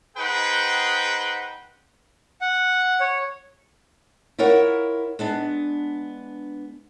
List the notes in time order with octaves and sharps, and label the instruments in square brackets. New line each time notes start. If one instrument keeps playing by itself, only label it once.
[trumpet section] D#4 G#4 B4 C5 F#5 G5
[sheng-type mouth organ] F#5
C#5
[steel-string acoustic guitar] E4 F4 A#4 C#5 F#5
G#3 B3 D4